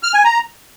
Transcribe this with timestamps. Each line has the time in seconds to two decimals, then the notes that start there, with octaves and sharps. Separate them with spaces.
0.03 F6
0.14 G#5
0.24 A#5